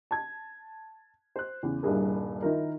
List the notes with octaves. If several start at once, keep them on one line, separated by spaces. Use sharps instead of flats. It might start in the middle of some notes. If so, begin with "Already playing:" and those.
A5 G#6
C5 F#6
E2 C#3
D#1 C2 G2 E4 G#4 A#4
D#3 E4 F4 A#4